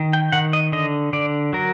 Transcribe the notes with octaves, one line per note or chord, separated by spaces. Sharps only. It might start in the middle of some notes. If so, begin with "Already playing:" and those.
Already playing: D#3
G5
D#3 F#5
D#5
D3 D#5
D3 D5
F#3 A#4